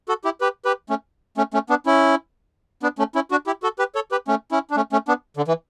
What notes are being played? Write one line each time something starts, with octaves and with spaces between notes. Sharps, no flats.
F#4 A4
E4 G4
G4 B4
G4 B4
A3 C#4
A3 C#4
A3 C#4
B3 D4
C#4 E4
B3 D4
A3 C#4
C#4 E4
D4 F#4
E4 G4
F#4 A4
G4 B4
A4 C#5
G4 B4
A3 C#4
C#4 E4
D4
A3 C#4
A3 C#4
B3 D4
D3
E3